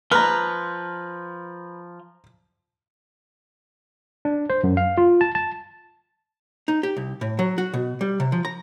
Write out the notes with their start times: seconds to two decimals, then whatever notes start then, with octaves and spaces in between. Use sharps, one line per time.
0.12 F3 B4 A#5 F6
4.25 D4
4.50 C5
4.64 F#2
4.77 F5
4.98 F4
5.21 A5
5.35 A5
6.68 D#4
6.83 G4
6.97 C2
7.21 A2
7.39 F#3
7.58 F#4
7.74 B2
8.01 G3
8.20 C3
8.32 F3
8.45 A#5